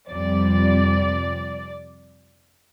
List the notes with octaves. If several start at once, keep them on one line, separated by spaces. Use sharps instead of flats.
F2 C3 G3 D5